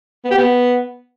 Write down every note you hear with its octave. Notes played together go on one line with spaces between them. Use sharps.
B3
G4
B3